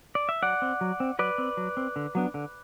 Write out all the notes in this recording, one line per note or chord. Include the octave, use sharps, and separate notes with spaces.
D5
E5
F#3 D5 F#5
C4
F#3
C4
F#3 B4 D5
C4
F#3
C4
D3
F#3 B3 D4
D3